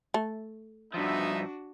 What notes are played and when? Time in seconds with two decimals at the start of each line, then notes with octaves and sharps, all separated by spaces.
0.14 A3
0.94 G2 F3 B3 D4 D#4 F#4 E5